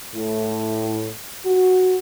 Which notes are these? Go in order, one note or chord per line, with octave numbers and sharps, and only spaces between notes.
A2
F#4